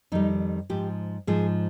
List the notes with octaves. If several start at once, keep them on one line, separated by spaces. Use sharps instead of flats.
F2 D#3 G3 D#4
G#2 F3 G4
G#2 F3 G#4